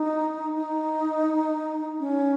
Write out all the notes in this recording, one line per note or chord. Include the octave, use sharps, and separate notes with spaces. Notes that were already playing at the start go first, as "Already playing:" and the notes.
Already playing: D#4
D#4
C#4